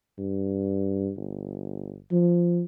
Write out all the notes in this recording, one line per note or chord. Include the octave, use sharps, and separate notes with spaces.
G2
G1
F3